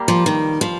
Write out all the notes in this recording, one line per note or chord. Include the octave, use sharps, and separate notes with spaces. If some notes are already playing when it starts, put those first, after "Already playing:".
Already playing: G3 A#3
F3
D#3
F3